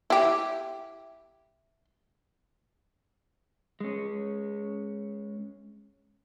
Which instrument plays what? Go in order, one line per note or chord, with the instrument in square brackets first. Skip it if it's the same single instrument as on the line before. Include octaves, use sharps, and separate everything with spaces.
[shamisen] E4 G4
[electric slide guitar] G#3 C#4